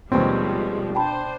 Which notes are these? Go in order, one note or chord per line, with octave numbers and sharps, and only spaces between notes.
D#2 B2 F3 G3 G#3 C4 B4 C#5
D4 C5 G5 A5 B5